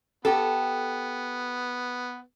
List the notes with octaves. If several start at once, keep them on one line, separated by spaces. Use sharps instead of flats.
B3 G4 A4